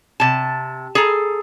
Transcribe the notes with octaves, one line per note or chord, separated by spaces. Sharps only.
C3 A5
G#4 A4 A#5